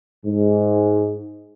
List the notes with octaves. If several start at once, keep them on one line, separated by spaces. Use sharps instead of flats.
G#2